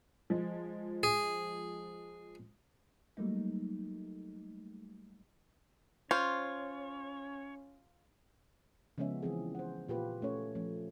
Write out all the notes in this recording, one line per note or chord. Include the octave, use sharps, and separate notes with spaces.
F3 G#3
G#4
F#3 G3 A3 A#3 D#4
C#4 F4 C5 C#5
C#3 F3 G#3 B3 C#4 E5
E3 F3 C4 G#4
C5 F#5
A#2 F4 G4 B4
A3 C#4 C#5
F3 A3 C#4